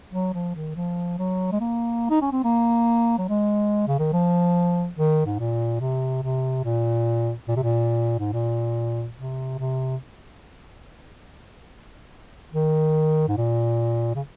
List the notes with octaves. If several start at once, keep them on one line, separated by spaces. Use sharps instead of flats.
F#3
F3
D#3
F3
F#3
G#3
A#3
D#4
C#4
C4
A#3
F#3
G#3
C#3
D#3
F3
D#3
G#2
A#2
C3
C3
A#2
A#2
C3
A#2
G#2
A#2
C3
C3
D#3
G#2
A#2
C#3